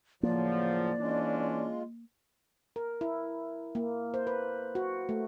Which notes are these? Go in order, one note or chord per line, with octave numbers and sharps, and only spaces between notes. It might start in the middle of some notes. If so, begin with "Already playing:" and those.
A2 C#3 F3 F#3 A#3 D5
E3 G#3 C#4 D4 F4
A#4
E4
A#3
C5
B4
F#4
A3